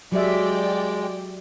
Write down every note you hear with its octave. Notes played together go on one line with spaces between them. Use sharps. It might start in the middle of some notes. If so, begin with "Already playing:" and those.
F#3 G#3 G4 D5 E5 G5